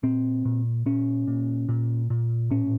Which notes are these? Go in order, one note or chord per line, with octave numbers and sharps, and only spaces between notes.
A#2 C4
A#2
A#2 C#4
A#2
A#2
A#2
A2 C#4